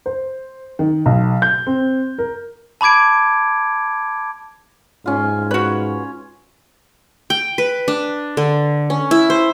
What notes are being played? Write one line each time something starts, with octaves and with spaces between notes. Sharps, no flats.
C5
D#3
B1
G6
C4
A#4
A5 B5 D6 G#6 D7
G#2 C#4 F4
F#4 B4 C#5
G5
B4
D4
D3
C#4
E4
C5